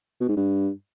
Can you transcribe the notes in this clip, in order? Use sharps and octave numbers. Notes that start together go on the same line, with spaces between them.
B2
G#2
G2